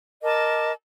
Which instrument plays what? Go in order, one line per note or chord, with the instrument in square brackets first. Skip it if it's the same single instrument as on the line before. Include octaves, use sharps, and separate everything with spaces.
[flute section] A#4 D#5 A5 D6